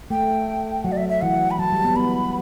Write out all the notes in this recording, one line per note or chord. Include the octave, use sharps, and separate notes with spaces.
A3 G5
F#3 F#5
D5
E5
E5
E3 F#5
B5
F#3 A5
G3
B3
B3 B5